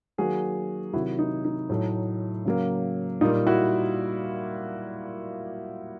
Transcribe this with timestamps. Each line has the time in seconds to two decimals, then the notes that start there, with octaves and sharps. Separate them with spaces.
0.18 D#3 F#3 A#3 F#4 G#4
0.93 C3 D#3 F#3 E4 F#4
1.19 D#4
1.45 D#4
1.69 A2 F#3 A3
2.45 C#3 F#3 A#3
3.21 A#2 G3 A#3 D#4 F4
3.47 E4 F#4